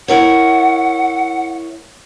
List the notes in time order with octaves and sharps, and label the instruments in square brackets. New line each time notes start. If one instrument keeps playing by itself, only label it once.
[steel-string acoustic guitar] E4 A#4 C#5 [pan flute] F#5